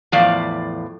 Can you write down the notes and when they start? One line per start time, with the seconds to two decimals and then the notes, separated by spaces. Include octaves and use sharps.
0.12 E2 A2 F3 D5 F5